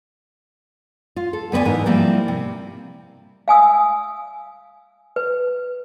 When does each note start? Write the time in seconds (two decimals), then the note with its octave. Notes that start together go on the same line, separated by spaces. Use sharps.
1.16 F4
1.33 A4
1.52 D2 B3 B4 D5 G#5
1.65 G#2 E3 A#4
1.86 F3 G3 A#3 C4 E4
2.28 C3
3.48 F5 G#5 D#6 E6
5.16 B4